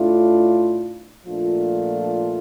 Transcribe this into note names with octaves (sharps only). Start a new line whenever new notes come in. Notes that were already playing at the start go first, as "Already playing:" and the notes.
Already playing: A2 A3 D4 F4
A#2 F3 A3 D4 F4